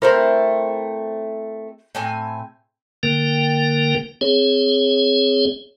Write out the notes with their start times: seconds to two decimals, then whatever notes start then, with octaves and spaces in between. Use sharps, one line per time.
0.02 A3 C4 E4 A#4 C5
1.95 A2 C4 G#5
3.03 D3 A#3 A#4 G5
4.21 C4 G#4 C#5